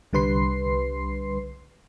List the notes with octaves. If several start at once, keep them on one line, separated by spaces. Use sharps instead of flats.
C2 D3 G3 B4 C6 C7